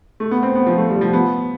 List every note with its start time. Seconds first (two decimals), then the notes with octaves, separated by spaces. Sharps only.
0.20 A3
0.31 B3
0.43 C4
0.55 B3
0.66 F3
0.78 A3
0.90 G3
1.01 F3
1.13 B3